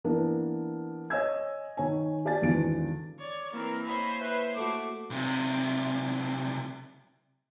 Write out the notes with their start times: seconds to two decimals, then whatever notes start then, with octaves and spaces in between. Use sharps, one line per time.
0.04 E3 A#3 B3 D4
1.10 C#5 D#5 G#5 E6 G#6
1.77 D#3 C#5 G#5
2.25 G4 D5 G#5 A6
2.42 G#1 E2 D3 D4 D7
3.19 C#5 D5
3.53 E3 A#3 C4 E4 A#4
3.87 C5 C#5 D#5 F5 G#5 B5
4.21 B4 E5
4.56 A3 F#4 D6
5.10 B1 C3